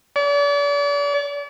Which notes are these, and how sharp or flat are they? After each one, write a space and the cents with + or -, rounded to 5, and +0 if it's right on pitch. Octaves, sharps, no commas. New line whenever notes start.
D5 -40